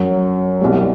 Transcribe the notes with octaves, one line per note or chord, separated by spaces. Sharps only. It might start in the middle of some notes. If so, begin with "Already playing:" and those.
Already playing: F#2 F#3
C2 B2 G3